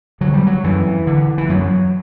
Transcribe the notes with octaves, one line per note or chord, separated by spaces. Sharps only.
D3 F#3
G3
F#3
F#2 E3
D3
E3
F#2 F#3